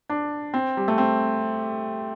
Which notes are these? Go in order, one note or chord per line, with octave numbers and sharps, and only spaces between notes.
D4
C4
G3
A3
C4